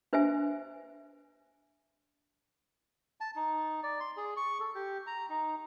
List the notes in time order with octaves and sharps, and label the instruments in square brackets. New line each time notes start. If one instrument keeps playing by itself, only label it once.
[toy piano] D4 B4 C5 E5 G#5
[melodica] A5
D#4
D5
C6
G#4
C#6
A4
G4
A#5
D#4